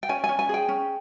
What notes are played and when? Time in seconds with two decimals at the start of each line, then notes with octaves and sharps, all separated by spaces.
0.03 G5
0.09 C#4 G#5
0.24 G#5
0.29 C#4
0.39 G#5
0.49 G#4 G5
0.69 C#4